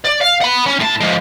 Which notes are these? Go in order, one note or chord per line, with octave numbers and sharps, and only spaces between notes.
D5
F5
F#5 B5
C#4
A2 A5
F3 G#3